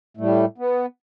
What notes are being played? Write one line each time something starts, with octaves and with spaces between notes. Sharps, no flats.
A2 G3 A3
B3